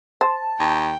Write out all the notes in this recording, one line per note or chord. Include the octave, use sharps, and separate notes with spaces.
C5 A5
D#2 G5